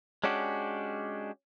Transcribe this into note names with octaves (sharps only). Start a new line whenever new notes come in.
G#3 C#4 D4 F#4 G4